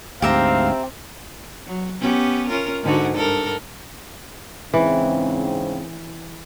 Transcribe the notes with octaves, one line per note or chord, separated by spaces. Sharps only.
D2 G#2 C4 G4 E5 F5 A#5
F#3
B3 C#4 G4
C#4 F4 A#4
G#2 D3 F#4
G2 A4 A#4
G#2 C#3 E3 C4